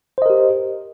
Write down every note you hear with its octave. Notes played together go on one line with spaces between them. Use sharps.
G4 A#4 C5 D#5